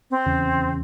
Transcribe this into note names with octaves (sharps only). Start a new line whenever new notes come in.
C4
E2 C#3